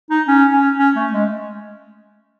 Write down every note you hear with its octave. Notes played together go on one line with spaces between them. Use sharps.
D#4
C#4
C#4
C#4
A3
G#3